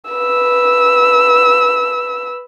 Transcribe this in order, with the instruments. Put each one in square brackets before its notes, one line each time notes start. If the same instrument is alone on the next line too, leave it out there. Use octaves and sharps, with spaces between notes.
[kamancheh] B4 E6